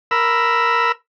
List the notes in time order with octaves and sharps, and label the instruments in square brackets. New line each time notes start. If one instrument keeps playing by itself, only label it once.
[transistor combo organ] A#4 B5 E6